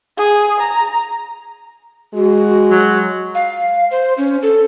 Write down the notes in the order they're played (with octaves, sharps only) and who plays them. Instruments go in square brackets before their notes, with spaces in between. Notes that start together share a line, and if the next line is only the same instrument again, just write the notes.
[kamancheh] G#4
A#5
[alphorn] G#3 [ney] F#4
[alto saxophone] F#3
[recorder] F5
C5
C#4
A4